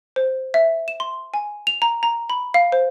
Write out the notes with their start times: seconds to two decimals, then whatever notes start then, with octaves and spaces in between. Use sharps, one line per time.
0.16 C5
0.54 E5
0.88 E7
1.00 C6
1.34 G#5
1.67 F7
1.82 A#5
2.03 A#5
2.30 B5
2.54 F5
2.72 C5